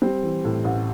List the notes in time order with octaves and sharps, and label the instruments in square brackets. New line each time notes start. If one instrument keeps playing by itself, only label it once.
[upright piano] G3 C4
E3
A2
A1